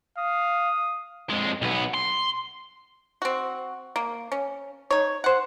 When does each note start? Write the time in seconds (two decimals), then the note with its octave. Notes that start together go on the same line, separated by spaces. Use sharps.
0.18 F5 D#6
1.30 F2 G#3
1.62 B1 B3
1.94 C6
3.22 C4 F#4
3.96 A#3
4.32 C#4
4.91 D#4 C#5
5.24 C5 F#5